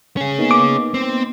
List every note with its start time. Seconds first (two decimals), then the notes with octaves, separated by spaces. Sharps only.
0.17 C#4 G#4
0.38 A#3 B3 D#4
0.51 D6
0.94 C4